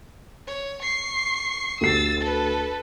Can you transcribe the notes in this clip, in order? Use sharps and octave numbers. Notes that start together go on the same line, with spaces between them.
C#5
C#6 C7
D2 G4 E6 A6 C7
A4 B4